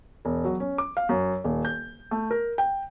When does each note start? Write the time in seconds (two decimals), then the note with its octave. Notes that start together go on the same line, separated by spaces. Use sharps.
0.25 E1
0.45 F#3
0.60 C#4
0.78 D6
0.97 F5
1.09 F#2
1.44 D#1
1.65 G6
2.11 A3
2.31 A#4
2.58 G5